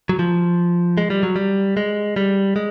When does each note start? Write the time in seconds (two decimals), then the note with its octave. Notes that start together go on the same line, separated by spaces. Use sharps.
0.09 F#3
0.19 F3
0.98 G#3
1.10 G3
1.23 F#3
1.36 G3
1.77 G#3
2.16 G3
2.56 G#3